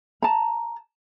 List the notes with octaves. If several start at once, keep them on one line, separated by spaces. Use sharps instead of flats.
A5 A#5